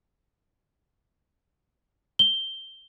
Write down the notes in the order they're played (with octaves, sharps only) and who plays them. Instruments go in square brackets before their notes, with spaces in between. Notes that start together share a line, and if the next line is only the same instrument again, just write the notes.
[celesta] G7